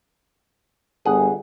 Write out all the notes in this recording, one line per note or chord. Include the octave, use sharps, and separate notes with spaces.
G1 G#4 F#5